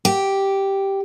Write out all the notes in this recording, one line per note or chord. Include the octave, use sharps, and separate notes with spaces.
G4